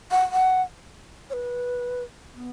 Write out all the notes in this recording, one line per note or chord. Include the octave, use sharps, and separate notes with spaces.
F#5
F#5
C#5
B4
B3